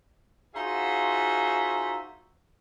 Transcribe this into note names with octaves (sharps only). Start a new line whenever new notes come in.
D#4 F4 F#4 G#4 C5 E5